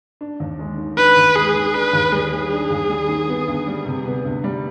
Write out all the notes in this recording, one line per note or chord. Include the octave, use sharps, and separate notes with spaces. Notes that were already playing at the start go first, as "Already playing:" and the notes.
D4
D#2
G#3
D#3
D4 B4
D#2
G#3 G#4
D#3
D4 B4
D#2
G3 G#4
D#3
D4
D#2
G3
D#3
B3
D2
G3
C3
B3
D2
G3